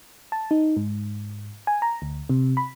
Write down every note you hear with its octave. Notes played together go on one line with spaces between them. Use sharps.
A5
D#4
G#2
G#5
A#5
D2
C3
B5